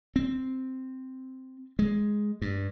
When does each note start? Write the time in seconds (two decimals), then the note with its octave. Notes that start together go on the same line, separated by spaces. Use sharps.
0.16 C4
1.79 G#3
2.42 G2